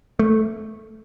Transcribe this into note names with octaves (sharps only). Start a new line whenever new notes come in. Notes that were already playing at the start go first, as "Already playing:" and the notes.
A3